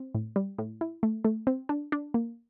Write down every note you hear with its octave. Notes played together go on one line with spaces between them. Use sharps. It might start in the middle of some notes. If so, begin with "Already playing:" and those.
Already playing: C4
A2
G3
A2
E4
A3
A3
C4
D4
D4
A#3